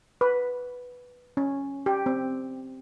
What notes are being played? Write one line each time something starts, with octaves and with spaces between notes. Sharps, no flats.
B4
C#4
G4
C4